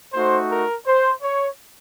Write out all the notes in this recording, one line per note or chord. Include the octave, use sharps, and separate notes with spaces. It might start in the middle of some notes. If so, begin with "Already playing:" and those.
A3 D#4 F#4 C5
A#4
C5
C#5